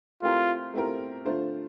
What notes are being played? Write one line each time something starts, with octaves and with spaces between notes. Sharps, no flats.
A3 C4 E4 F4 G4 A#4
A3 C4 E4 G4 A#4
D3 A3 D4 F4 C5